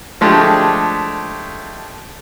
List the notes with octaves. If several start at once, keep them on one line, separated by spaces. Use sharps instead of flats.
F3 G#3 A3 D4 G4